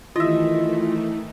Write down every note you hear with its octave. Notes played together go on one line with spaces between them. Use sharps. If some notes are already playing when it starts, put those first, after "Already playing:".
D#3 E3 A3 E4 F4 D#5 E5